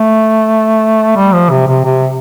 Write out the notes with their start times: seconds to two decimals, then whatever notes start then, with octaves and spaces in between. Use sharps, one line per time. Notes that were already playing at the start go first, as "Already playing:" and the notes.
Already playing: A3
1.16 G3
1.33 F3
1.50 C3
1.68 C3
1.85 C3